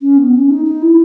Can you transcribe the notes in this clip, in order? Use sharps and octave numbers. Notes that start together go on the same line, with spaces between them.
C#4
B3
C#4
D#4
D#4
E4